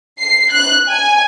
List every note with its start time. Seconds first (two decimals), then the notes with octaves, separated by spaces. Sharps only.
0.19 C7
0.51 F#6
0.89 G#5